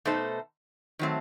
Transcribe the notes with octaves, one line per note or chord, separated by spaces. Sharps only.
B2 A3 D#4 A4 C5
D#3 F#3 A3 C4